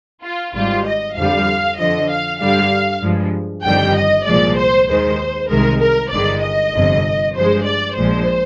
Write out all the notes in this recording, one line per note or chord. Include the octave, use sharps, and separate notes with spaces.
F4
G#1 G#2 G3 F4
D#5
F2 D3 G3 F5
F2 D3 F3 D#5
F5
G2 D3 G3 F5
G2 F3 G#3
G1 F2 D#3 G3 G5
D#5
C2 A#2 F3 G#3 D5
C5
D#2 D#3 G#3 C5
C2 C3 D#3 G#3 A#4
A#4
G1 G2 D#3 G#3 D5
D#5
G1 F2 C3
G2 F3 G#3 C5
D5
A#1 A#2 F3 G#3 C5